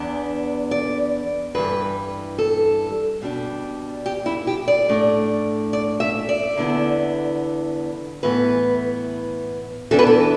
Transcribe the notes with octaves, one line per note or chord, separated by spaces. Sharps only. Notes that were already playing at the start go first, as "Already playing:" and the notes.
Already playing: E2 B3 D4
D5
G2 E3 G3 B4
A4
B2 G3 D4
G4
E4
G4
D5
A2 A3 D4
D5
E5
D5
E2 D3 B3 E4
A2 E3 B3 B4
E2 E3 B3 D4 A4
B4
A4